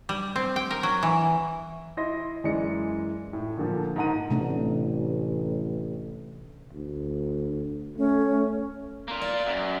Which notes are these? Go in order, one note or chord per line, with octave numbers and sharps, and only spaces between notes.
G3
C4
G5
A#4
F#3
E3
E4 D#5 C6 A#6
F#2 E3 G#3 D5 D#5 C#7
A2
A#2 D3 F3
G#2 D#3 A#3 F#5 A#5 D#7
A1 C3 A3 D4
D2
A3 C#4
A#3 F4
D5
F#2